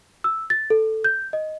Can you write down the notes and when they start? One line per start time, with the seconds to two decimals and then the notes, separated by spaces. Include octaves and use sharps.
0.24 E6
0.50 A6
0.70 A4
1.04 G6
1.33 D#5